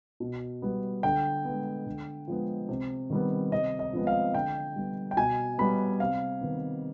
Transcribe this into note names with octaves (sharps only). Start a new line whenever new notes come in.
B2
G3 B3
D3 G5
G#3 B3
D3
F3 G#3 B3
C3
D#3 G3 B3
C3 D#5
D#5
F3 G#3 B3
F5
D3 G5
G3 B3
G5
B2 G#5
G3 B3 B5
C3 F5
D#3 B3